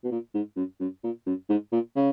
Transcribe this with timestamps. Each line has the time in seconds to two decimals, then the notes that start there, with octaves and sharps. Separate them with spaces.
0.04 B2
0.11 A#2
0.34 G#2
0.56 F#2
0.80 F#2
1.04 A#2
1.26 F#2
1.49 G#2
1.72 A#2
1.96 C#3